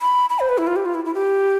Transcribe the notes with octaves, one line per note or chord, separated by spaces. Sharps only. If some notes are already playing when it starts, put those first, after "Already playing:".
B5
B5
C5
B4
E4
F4
G4
F4
E4
E4
G4